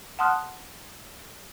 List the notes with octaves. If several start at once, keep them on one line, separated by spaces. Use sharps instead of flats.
F#5 A5 C6 D#6 F6 F#6